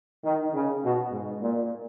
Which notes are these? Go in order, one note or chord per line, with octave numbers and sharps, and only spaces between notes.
D#3
C#3
B2
G#2
A#2